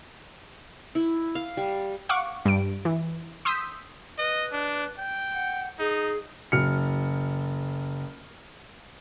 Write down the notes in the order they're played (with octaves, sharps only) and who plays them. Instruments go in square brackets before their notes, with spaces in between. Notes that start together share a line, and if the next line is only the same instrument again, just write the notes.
[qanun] E4
F5
G3
[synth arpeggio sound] F5 F#5 C#6 D6
G2 D7
E3
C6 D#6 E6 G6 B6
[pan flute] B4 [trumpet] D#5
[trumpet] D4
G5
[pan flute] F#5
[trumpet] D#4 [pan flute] G#4
[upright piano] F#1 F6 C#7